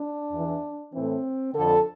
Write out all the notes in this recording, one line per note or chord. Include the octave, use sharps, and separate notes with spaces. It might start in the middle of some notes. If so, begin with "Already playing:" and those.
Already playing: D4
E2 E3
A2 E3 C4
F2 D3 A4